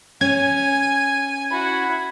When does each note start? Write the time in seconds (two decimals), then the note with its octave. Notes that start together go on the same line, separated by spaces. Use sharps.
0.21 C#4 G#5 G#6
1.50 E4 F#4 B5